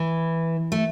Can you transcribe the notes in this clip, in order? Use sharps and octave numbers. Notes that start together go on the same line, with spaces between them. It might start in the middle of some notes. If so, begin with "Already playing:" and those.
Already playing: E3
A3